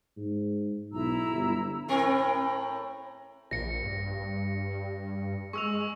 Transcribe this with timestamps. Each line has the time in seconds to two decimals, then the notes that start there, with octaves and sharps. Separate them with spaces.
0.17 G#2
0.92 B1 E4 A#5 E6
1.31 G1
1.88 A2 C4 A#4
3.51 A#1 A#6 C#7
3.83 G2
5.53 G#3 C#6 E6 F7